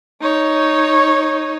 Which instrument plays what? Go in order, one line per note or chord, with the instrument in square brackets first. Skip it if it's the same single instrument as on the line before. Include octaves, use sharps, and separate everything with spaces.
[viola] D#4 C#5